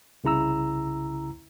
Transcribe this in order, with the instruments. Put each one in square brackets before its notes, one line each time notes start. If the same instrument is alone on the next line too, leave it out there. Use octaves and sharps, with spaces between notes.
[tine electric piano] C2 C#3 E4 A#5 E6